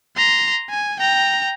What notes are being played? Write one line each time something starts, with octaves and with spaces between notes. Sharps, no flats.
A#5 C6
G#5
G5 A#5